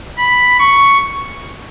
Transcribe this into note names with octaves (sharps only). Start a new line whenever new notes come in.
B5
C#6